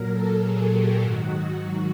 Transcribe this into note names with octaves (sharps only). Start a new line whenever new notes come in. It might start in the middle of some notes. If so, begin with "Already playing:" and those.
Already playing: A#2 F#3 A#4
A4
G#4
G4
G#2 D#3 F#3 F#4
F#4